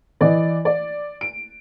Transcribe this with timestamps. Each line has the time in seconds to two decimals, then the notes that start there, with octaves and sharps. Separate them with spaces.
0.21 E3 D5 D#5
0.65 D5
1.21 D7